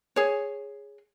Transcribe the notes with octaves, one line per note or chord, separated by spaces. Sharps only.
G#4 C#5